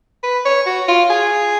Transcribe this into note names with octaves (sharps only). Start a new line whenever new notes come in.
B4
C#5
F#4
F4
G#4